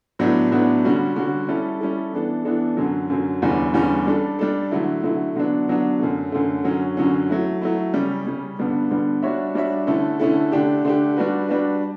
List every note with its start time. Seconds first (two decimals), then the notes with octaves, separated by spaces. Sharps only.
0.19 A2 F#3 B3 D4
0.51 A2 F#3 B3 D4
0.85 D3 G3 C#4 F#4
1.16 D3 G3 C#4 F#4
1.48 G3 C#4 E4 A4
1.81 G3 C#4 E4 A4
2.13 E3 B3 D4 A4
2.45 E3 B3 D4 A4
2.77 F#2 D3 F#3
3.10 F#2 D3 F#3
3.42 E2 D3 G3 C#4
3.74 E2 D3 G3 C#4
4.07 G3 D4 A4
4.39 G3 D4 A4
4.71 D3 F#3 A3 E4
5.03 D3 F#3 A3 E4
5.36 D3 F#3 B3 D4
5.68 D3 F#3 B3 D4
6.00 F#2 D3 A3
6.32 F#2 D3 A3
6.64 F#2 D3 F#3 C#4
6.97 F#2 D3 F#3 C#4
7.30 F#3 A3 E4
7.61 F#3 A3 E4
7.94 C#3 G3 C#4
8.26 C#3 G3 C#4
8.59 G2 D3 G3 B3
8.90 G2 D3 G3 B3
9.23 G3 D4 F#4 C#5 E5
9.55 G3 D4 F#4 C#5 E5
9.87 D3 A3 C#4 E4 A4
10.20 D3 A3 C#4 E4 A4
10.52 D3 A3 D4 G4
10.85 D3 A3 D4 G4
11.17 G3 D4 F#4 B4
11.49 G3 D4 F#4 B4